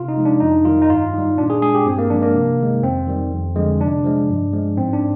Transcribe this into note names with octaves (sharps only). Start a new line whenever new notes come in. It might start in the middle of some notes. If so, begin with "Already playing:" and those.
Already playing: C3 F4
D#4
F3 G#3
D4
F2 D#4
D#3 G3 F4
D#4
G2 F4
D#3 G3 D#4
A#2 D4
G#4
G#3 G#4
G4
G2 C4
A#3
F3 G#3 D4
A#3
C3
D#3 G#3
F2 C4
D#3 G3
F2
D3 F3 G#3
C3 D4
F3 G#3
G2
F3 G#3
G#2 C4
D4